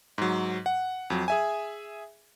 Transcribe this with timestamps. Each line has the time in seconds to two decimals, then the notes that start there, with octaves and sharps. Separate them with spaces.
0.18 G#2 F#3
0.66 F#5
1.10 F2 F#3
1.28 G#4 E5 G#5